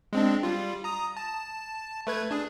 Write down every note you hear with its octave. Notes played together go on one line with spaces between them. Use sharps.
G#3 C4 D4
G3 F4
A#5 D#6
A5
A3 B4 G#6
D4 G#4